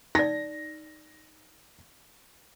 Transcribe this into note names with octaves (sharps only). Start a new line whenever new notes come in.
D#4 D5 A#6